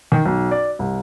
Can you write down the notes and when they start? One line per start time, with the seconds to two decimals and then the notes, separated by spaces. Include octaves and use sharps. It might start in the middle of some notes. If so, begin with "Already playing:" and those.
0.12 D#3
0.26 B1
0.51 D5
0.79 C2